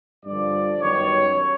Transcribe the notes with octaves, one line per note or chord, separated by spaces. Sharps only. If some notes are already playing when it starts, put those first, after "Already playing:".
G2 D3 F3 D5
F#2 D#3 G3 B3 C#5